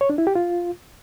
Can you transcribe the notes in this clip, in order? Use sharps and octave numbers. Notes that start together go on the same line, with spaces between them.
C#5
D4
E4
G4
F4